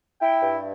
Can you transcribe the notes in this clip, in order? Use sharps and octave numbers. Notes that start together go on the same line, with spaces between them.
E4 G5
G2